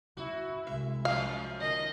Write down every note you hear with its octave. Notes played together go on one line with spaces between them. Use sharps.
E4 F#4
C2 G#3 E5
F#2 F3 A3 F5
D#3 D#5